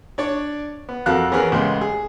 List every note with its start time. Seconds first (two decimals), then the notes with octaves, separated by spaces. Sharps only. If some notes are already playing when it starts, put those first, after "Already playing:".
0.18 D4 C#5 D5
0.89 B3
1.06 F2 F#4 A4 A#4 F5 F#6
1.32 E3 B3 C#4 G#4 A#4 B4
1.52 A1 C#3 G#3 B3 C6
1.81 G#4